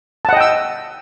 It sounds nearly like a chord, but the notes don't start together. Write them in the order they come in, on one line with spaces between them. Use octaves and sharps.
A5 F#5 D#5 G5 E6